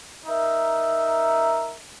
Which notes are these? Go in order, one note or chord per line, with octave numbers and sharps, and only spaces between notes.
D#4 A#4 E5